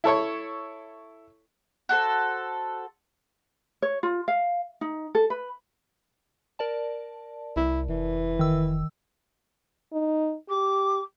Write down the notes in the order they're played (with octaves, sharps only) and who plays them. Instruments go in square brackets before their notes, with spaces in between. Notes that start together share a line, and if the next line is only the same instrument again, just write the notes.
[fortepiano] E4 A4 C#5 C#6
[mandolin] F#4 A4 C5
[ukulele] C#5
F4
F5
D#4
A4
B4
[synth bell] A#4 D5 A5
[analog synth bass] C2 [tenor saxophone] E4
[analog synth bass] F1 [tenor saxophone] E3
[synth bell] D#3 E6
[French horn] D#4
[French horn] G4 [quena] D6